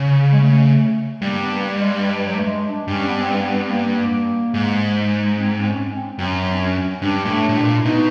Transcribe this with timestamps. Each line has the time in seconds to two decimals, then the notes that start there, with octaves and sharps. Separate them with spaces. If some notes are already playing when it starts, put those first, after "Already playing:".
Already playing: C#3
0.32 G#3
0.39 A3
1.22 G2 A#3
1.40 B3
1.49 A#3
1.77 G#3
2.05 G3
2.25 F#3
2.36 A3
2.46 G#3
2.67 D4
2.88 G2 C#4
3.06 B3
3.16 C4
3.39 A#3
3.43 B3
3.53 C4
3.63 B3
3.71 A#3
4.54 G#2
5.36 C4
5.60 C4
5.65 C#4
5.91 C4
6.19 F#2 C4
6.27 C#4
6.37 C4
6.54 D4
6.61 C#4
7.02 G2 D4
7.25 A#2
7.30 A2
7.49 A2
7.57 A#2
7.77 E4
7.84 B2 D#4